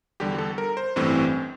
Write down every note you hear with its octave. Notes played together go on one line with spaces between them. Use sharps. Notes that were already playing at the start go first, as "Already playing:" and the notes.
E2 D3 G3 G4
A4
A#4
C5
A1 G2 E3 A3 C4